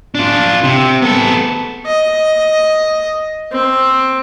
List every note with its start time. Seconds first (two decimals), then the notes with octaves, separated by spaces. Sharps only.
0.15 D4 F4
0.64 C3
1.02 B3 A4
1.86 D#5
3.52 C4